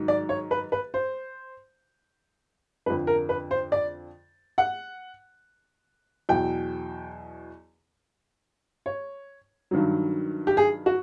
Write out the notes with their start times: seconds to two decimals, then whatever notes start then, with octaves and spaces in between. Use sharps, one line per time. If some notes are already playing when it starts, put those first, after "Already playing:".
Already playing: G#2 D#3 F#3
0.08 D5
0.29 C#5
0.51 B4
0.72 B4
0.94 C5
2.86 F2 D3 F3 B4
3.07 A#4
3.29 B4
3.51 C5
3.72 D5
4.58 F#5
6.29 E2 B2 F#3 G5
8.86 C#5
9.71 G2 D#3 F#3
10.47 G4
10.57 G#4
10.86 F#4